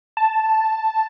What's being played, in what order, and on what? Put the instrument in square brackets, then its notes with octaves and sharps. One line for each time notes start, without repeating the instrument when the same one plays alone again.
[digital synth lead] A5